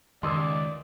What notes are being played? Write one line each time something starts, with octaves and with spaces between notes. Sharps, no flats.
C#2 D#3 D5 C6 D#6 E6